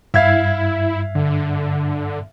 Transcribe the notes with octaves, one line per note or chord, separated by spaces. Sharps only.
G2 E4 E5 F5 G#6
D3